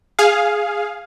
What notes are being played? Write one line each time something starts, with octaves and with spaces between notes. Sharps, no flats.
G#4 F5